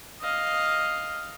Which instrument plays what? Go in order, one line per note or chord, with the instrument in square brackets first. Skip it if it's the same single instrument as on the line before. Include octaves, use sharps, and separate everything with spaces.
[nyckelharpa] D#5 F5